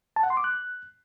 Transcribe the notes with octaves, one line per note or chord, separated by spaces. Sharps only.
A5
F#5
C6
D6
F#6